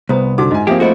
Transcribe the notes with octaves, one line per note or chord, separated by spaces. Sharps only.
C2 B3 C5 A#5 D#6
D3 D#4 F#4 F#5 D6
G#2 D#5 G#5
F3 A#3 C4 G4 G#4
A3 E4 F#4 A4 C5 D#5